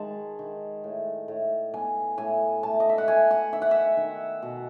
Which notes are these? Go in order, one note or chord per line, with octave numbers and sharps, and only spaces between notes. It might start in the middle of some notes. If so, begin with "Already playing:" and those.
Already playing: D#3 G#3 A5
D#3
A2
A2
B3 G#5
A2 G#5
A3 A5
D#5
E5
F#5
A3 G#5
F#5
D#3 E5
F#5
E5
D#3
B2